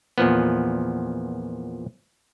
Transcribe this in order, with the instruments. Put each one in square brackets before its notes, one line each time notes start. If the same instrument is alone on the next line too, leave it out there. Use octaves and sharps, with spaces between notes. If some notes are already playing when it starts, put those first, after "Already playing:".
[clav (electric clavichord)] E2 A#2 F3 B3